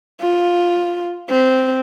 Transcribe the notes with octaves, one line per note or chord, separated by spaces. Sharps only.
F4
C4